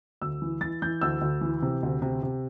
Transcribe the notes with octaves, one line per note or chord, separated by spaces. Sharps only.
D2 E6
E3
E3 A6
E3 G6
D2 E6
D2
E3
C3
D2
C3
C3